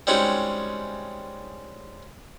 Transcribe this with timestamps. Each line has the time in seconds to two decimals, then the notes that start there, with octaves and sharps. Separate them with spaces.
0.07 G3 G#3 C4 C#4 D#4 F#4